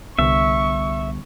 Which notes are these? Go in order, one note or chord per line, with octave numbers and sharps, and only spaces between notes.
C2 D3 G3 B3 E5 C#6